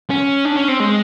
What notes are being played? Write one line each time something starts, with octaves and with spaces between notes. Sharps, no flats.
C#4
D4
C#4
C4
G#3